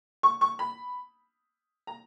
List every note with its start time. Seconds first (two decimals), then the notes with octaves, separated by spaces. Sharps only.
0.23 C#6
0.41 C#6
0.59 B5
1.87 A#5